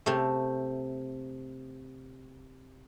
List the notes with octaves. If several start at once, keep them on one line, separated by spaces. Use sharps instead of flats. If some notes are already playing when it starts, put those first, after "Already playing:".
C3 A3